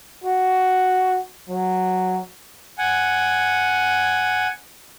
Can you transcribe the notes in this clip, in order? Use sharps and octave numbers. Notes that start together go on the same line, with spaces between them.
F#4
F#3
F#5 G#5